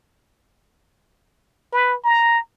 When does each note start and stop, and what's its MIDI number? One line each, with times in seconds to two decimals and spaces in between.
1.73 1.95 71
2.04 2.39 82